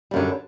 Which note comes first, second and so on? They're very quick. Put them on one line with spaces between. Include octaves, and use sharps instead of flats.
G3 F#2 D3